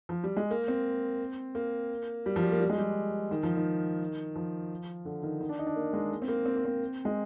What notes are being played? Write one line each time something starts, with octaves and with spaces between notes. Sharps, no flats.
F3
G3
G#3
A#3
C4
A#3
G3
F3
G3
A#3
G3
G#3
G3
D#3
F3
D#3
F3
D3
D#3
D#3
D4
D#4
D4
A#3
G#3
A#3
C4
A#3
C4
A#3
C4
G#3